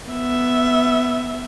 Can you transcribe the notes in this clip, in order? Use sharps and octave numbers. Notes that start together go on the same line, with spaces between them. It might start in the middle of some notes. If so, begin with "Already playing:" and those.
B3 E5